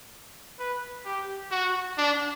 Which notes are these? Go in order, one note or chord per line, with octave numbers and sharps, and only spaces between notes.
B4
G4
F#4
D4